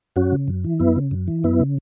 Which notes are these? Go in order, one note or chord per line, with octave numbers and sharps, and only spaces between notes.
F#2 C#4 F#4
C#3
F#2
E3
F#2 B3 E4
C#3
F#2
E3
F#2 B3 E4
C#3